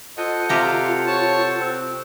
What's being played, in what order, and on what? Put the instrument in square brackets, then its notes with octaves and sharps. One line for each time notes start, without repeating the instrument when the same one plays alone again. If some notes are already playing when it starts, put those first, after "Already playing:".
[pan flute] F4 [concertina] A4 C5 F#5 [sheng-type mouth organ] D#5
[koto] C3 G4 A#5 [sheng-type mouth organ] F5
[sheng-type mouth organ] C#5 A5
C4